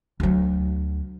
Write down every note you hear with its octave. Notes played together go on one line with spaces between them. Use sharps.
D2 F#3